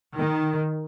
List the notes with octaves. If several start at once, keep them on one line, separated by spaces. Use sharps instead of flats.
D#3